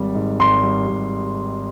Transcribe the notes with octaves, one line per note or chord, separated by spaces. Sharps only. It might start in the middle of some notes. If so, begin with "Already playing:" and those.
Already playing: G#1 G3
G#2
G#1 C6
G3
G#1